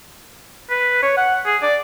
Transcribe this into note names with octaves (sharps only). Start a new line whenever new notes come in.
B4
C#5
F#5
G#4
D5